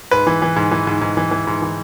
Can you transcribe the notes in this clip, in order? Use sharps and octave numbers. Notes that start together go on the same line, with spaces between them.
G#2 B4
E3
E3
G#2
E3
G#2
G#2
E3
E3
G#2
E3